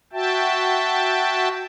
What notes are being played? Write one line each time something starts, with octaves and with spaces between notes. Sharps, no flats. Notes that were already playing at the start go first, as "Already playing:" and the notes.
F#4 E5 G5 A5